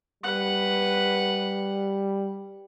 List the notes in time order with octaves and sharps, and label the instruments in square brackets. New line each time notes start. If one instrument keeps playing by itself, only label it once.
[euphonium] G3 [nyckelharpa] B4 F#5